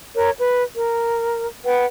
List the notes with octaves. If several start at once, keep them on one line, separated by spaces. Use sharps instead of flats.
A#4 C#5
B4
A#4
B4 F#5 G5